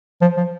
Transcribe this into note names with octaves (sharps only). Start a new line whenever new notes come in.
F3
F3